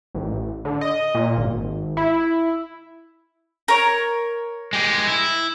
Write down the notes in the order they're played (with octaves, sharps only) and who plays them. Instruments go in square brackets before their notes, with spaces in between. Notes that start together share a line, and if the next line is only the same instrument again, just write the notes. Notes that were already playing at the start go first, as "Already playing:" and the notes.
[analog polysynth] A1
D3
D#5
A#2
G#1
E4
[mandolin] A#4 C#5
[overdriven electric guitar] G#3 G4
E4